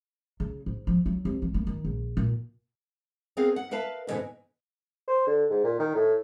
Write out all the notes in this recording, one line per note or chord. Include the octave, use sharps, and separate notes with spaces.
C#3
G#2
F3
F#3
C2
E3
A#3
D#3
A#1
A#2
B3 C4 G#4 A#4 F5
F#5
A#4 B4 E5 F5 A5
D#2 G#2 B2 D3 E3 C#4
C5
D3
G#2
A#2
D#3
A2